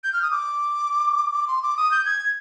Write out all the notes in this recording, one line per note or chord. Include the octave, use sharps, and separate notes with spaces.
G6
F6
D#6
D6
D6
C6
D6
D#6
G6
G#6